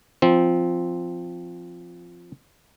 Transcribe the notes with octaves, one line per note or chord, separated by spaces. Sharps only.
F3 C4